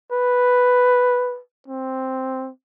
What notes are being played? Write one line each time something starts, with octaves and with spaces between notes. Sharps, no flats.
B4
C4